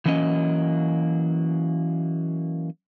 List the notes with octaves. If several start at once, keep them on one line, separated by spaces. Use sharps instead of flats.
E3 F#3 A#3 C#4 D#5